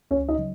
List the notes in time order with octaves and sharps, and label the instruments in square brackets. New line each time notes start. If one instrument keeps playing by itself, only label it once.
[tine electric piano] C#2 [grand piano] C#4 C#5
[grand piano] D#4 D#5
[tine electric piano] C#3 F#3